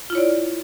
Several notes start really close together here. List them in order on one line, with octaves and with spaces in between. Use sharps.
F4 E4 C#5 D5